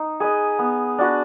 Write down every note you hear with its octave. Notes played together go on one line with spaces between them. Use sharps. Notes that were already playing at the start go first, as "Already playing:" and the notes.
Already playing: D#4
G#4 B4 D#5
B3
D4 F#4 B4